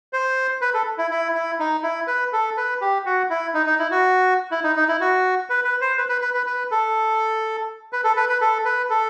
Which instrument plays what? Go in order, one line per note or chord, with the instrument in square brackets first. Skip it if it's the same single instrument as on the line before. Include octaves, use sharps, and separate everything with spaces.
[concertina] C5
B4
A4
E4
E4
E4
D#4
E4
B4
A4
B4
G4
F#4
E4
D#4
D#4
E4
F#4
E4
D#4
D#4
E4
F#4
B4
B4
C5
B4
B4
B4
B4
B4
A4
B4
A4
B4
B4
A4
B4
A4